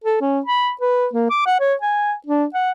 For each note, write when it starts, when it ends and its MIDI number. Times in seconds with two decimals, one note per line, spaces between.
0.04 0.19 69
0.21 0.40 61
0.46 0.71 83
0.81 1.07 71
1.13 1.26 58
1.30 1.43 86
1.46 1.59 78
1.60 1.75 73
1.82 2.14 80
2.27 2.45 62
2.54 2.71 78